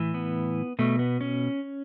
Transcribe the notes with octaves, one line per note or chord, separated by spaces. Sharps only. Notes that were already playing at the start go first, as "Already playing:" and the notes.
Already playing: A2 E3
B3
B2 A3
B3
C#4